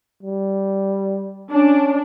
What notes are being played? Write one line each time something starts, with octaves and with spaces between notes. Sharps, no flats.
G3
C#4 D4